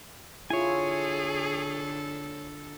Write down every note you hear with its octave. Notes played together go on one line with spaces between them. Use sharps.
D3 E4 F4 G#4 A4 C#5 G#5